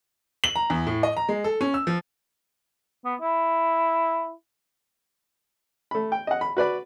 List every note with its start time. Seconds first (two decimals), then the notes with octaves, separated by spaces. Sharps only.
0.44 F#7
0.56 A#5
0.70 E2
0.87 A2
1.03 D#5
1.17 A#5
1.29 G#3
1.44 A4
1.61 C#4
1.74 E6
1.87 F3
3.05 B3
3.21 E4
5.91 A3 B5
6.12 G5
6.27 D#5 F#5
6.41 B5
6.57 F#4 B4 D5 B5